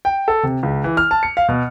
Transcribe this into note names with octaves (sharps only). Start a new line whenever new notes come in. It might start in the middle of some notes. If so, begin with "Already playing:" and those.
G5
A4
C3
C#2
E3
F6
A5
C#7
F5
B2